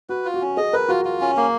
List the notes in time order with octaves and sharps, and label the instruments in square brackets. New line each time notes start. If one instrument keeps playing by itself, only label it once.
[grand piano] F#4 [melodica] B4
[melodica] F4
[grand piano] F#4
[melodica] C#4
[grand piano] G#4 [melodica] D#5
[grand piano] A#4 [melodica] B4
[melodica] F4 [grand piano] F#4
[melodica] F4
C#4
A#3